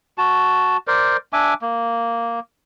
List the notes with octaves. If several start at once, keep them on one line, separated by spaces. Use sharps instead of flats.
F#4 A5
A#4 C5 D5
D4 E5 G#5 D6
A#3